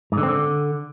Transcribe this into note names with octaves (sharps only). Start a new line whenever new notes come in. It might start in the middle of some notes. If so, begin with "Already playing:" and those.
G#2
D3
C4
D3